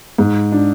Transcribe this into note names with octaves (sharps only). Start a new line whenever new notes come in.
G#2
D4